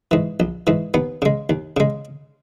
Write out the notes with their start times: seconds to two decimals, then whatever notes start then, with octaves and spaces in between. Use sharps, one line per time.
0.11 G#2 E3
0.40 A#1
0.67 G#2 E3
0.94 D#2 B3
1.22 C#3 G#3
1.50 D#2
1.77 C#3 G#3